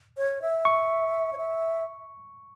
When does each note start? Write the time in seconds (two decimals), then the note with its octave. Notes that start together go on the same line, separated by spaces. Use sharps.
0.17 C#5
0.42 E5
0.65 C#6
1.33 C#5
1.37 E5